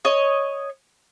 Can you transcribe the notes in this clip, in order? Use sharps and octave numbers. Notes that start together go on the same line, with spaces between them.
C#5 D#5